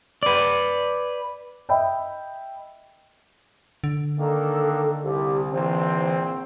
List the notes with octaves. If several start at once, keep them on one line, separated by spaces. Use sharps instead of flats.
B4 D5
D#5 E5 G5 B5
D3
D#3 A#3 D4 A4
C2 G4
A#1 E3 C4